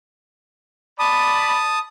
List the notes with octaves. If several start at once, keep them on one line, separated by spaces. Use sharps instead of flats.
D5 A5 B5 D#6